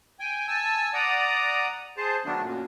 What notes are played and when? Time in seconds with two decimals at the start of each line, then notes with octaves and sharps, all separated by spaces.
0.19 G5 G#5
0.48 G#5 A5 E6
0.94 D5 F#5 A#5 D#6
1.97 G#4 C5 A5
2.25 D#3 F#3 A3 B3 D4
2.41 F#2 A#2